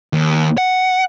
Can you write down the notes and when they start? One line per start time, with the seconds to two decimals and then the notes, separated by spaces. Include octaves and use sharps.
0.13 D#2
0.58 F#5